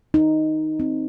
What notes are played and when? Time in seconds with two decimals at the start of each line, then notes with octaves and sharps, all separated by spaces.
0.14 D#4
0.80 C4